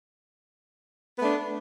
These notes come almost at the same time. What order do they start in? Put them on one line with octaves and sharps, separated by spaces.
B3 A3 D4